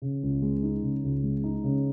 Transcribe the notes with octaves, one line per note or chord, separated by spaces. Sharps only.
C#3
C#2
G#3
D#4
C#3
C#2
G#3
D#4
C#3